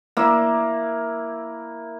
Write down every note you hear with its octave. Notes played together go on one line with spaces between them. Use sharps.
A#3 E4